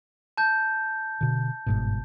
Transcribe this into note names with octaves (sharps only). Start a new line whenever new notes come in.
A5 G6
B2 D3
G1 G#2 B2